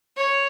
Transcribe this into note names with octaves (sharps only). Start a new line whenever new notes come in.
C#5